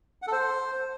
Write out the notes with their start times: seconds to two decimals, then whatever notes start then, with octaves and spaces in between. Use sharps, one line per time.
0.22 F#5
0.27 A4
0.32 C5